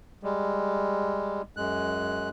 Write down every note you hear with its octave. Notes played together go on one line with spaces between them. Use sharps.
G3 G#3
F#2 G#3 F#6